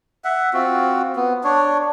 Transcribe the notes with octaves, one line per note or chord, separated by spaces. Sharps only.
E5 F#5
C4 F4 F#4
B3
D4 C#5